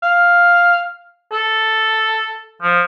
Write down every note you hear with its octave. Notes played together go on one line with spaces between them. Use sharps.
F5
A4
F3